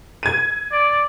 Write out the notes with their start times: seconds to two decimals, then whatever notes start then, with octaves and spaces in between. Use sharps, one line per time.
0.23 G#6 D#7
0.72 D5